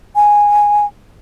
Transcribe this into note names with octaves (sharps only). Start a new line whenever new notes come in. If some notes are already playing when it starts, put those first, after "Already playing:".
G#5